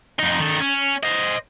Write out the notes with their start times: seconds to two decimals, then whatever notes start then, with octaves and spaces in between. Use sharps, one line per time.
0.19 F2 D#4
0.40 D#3 A4
0.60 C#4
1.03 C5 D#5